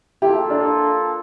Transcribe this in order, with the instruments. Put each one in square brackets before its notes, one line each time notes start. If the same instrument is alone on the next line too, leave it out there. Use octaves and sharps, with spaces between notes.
[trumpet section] A#3 F4 A4 [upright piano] E4 G4
[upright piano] D4